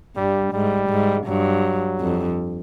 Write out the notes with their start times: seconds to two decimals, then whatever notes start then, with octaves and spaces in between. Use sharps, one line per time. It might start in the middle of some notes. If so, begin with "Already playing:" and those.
0.16 G2 G3
0.53 G#2 G3
0.90 G#2
1.26 G2 F#3
2.00 F2